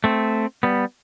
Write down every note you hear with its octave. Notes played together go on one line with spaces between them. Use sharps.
A3 C4
G3 B3